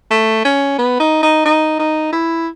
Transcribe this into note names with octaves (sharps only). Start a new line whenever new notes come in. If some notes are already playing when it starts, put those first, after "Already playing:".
A3
C#4
B3
D#4
D#4
D#4
D#4
E4